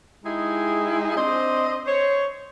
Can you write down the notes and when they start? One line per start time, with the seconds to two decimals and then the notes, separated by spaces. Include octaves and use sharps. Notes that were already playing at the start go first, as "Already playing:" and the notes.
0.25 G#3 D#4 E4 G4 G#4
1.16 C4 D4 C5 D#5
1.86 C5 C#5